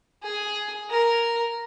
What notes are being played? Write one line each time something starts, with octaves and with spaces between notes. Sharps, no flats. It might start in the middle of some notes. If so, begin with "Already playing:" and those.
G#4
A#4